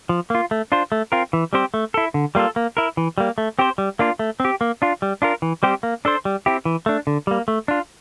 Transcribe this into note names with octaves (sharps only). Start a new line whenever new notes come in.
F3
A#3 F4
A3
D4 F4 C5
A3
C4 F4 A#4
E3
G3 C4 G4 C5
A3
E4 A4
D3
G3 A#3 F4 A4
A#3
E4 A#4
E3
G3 A#3
A3
C4 G4 C5
G3
A#3 D4 F4
A3
C4 G4
A#3
D4 F4
G3
D4 F4 A#4
E3
G3 C4 G4 C5
A#3
D4 A4 C5
G3
C4 E4 G4
E3
A3 D4
D3
G3 A#3
A3
D4 F4